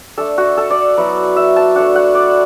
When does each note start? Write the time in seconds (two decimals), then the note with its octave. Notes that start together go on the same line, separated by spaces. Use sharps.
0.17 A3 D4 A4
0.38 F#4
0.57 A4
0.70 D5
0.97 F#3 B3 E4
1.36 E5
1.56 A5
1.75 A3 D4 F#5
1.96 F#5
2.15 D5